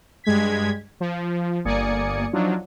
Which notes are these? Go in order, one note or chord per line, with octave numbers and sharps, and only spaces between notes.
G2 G#3 G#6 B6
F3
G1 A#3 D5 G#5 D#6 C#7
F3 F#3 D4 D#4 F4